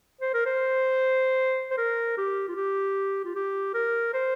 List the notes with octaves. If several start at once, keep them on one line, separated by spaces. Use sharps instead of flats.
C5
A#4
C5
C5
A#4
G4
F4
G4
F4
G4
A#4
C5